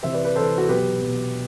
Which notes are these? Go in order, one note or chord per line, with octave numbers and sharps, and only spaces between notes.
C3 E3 C5 E5
B4 D5
B4 D5
C3 E3 A4 C5
F#4 A4
B2 F#3 G4 B4
B2 F#3